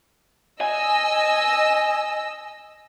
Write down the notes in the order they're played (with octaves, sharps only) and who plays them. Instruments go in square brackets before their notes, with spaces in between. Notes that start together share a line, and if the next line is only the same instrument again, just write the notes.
[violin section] D#5 E6 [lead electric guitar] G#5